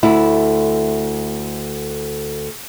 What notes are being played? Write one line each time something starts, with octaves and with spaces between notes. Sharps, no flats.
D2 A3 E4